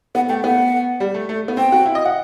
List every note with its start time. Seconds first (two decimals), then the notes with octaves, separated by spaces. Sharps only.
0.15 B3 F#5
0.29 A3 G5
0.44 B3 F#5
1.00 G3
1.14 A3
1.29 A3
1.48 B3
1.57 C4 G5
1.72 F#4
1.86 E4
1.95 D#5
2.05 F#5